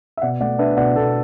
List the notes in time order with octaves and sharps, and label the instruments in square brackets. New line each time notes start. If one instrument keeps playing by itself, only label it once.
[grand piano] E5
B2 D5 F#5
A3 D5 F#5
D4 B4 E5
B2 D5 F#5
B2 A4